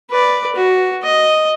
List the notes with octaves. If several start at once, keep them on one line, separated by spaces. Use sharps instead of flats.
B4 D5
F#4
D#5